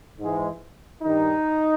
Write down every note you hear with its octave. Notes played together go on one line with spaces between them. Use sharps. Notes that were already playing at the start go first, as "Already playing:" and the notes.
G#2 E3 G#3
G2 D#3 G3 D#4